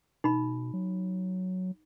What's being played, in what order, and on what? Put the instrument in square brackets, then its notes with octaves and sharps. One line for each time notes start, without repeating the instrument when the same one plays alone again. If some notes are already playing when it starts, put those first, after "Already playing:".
[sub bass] B2 [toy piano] D#4 B5
[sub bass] F#3